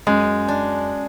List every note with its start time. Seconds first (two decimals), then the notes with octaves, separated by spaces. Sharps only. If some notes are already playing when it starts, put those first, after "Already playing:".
0.07 F#2 G#3
0.48 D4